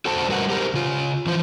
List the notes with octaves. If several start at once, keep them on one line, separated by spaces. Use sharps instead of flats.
F#4 A4 C5 A5
G3 F#4 A#4 B4 F#5
G4 A#4 C5
C#3 F4
E3 F3 C5